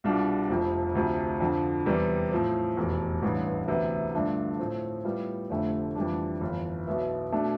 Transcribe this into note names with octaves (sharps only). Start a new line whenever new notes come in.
C2 B2 G3 D4 F4
F1 F2 C3 F3
D2 C3 F3
F2 D3 F3
E2 C3 G3 B3
A2 F3 C4
F1 E2 B2
A1 G2 E3 B3
D2 C3 E3 B3 E4
G2 D3 A3 D4 F4
A2 F3 C4
A2 G3 B3 F4
F1 F2 D3 A3
F2 E3 G3 D4
G1 F2 E3
B1 B2 B3 E4
B2 A3 D4